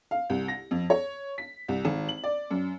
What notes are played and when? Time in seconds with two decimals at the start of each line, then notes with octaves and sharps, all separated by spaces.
0.11 F5
0.30 C2
0.48 A#6
0.71 F2
0.90 C#5
1.38 B6
1.68 C2
1.85 G#1
2.09 F#7
2.24 D5
2.51 F#2